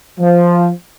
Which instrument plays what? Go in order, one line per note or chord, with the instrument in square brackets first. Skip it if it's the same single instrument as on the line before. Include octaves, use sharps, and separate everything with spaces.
[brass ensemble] F3